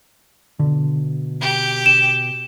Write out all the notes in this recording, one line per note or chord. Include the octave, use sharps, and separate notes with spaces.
B2 D3
G4
E7